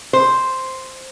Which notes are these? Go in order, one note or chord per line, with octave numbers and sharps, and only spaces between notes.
C5